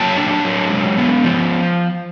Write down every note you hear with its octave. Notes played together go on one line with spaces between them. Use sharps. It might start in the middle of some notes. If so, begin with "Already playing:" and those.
Already playing: F#3 A#3 G5 A5
D4
F#3
G#3
B3
F3